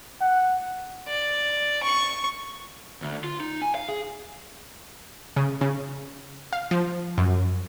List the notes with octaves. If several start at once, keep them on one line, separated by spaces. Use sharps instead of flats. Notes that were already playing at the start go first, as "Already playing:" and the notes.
F#5
D5
C#6
D2
F4
D#4
G#5
F5
G#4
C#3
C#3
F5
F3
F#2